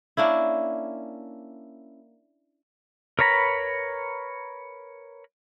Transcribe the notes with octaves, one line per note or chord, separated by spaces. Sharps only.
A#3 C#4 D4 E4
A#4 B4 C#5 A#5 B5